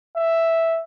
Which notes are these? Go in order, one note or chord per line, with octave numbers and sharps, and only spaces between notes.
E5